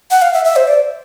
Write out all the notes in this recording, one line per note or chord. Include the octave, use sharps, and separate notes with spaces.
F#5
F5
E5
E5
C5
D5